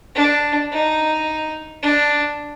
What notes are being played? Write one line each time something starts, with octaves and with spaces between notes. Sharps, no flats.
D4
D#4
D4